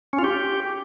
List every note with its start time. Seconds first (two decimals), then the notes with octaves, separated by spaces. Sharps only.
0.13 C#4
0.19 F4
0.24 G4